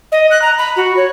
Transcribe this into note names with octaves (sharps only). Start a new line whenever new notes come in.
D#5
F#6
A#5
B5
F#4
C#5